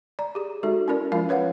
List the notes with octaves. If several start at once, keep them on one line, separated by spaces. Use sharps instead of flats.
D5 A#5
G4 G#4
G#3 D#4 F#4 A4 E5
C#4 E4 A#4 D5
F3 G#3 C#4 F4 A#4 F5
B4 C#5 F5 F#5